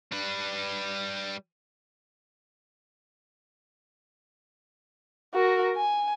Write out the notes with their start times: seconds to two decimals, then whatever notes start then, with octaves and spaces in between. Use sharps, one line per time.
0.12 G3 B4
5.34 F#4 A#4
5.76 G#5